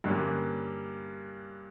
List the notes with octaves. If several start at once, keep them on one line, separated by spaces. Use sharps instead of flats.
G2 D3 G3 A#3 C#4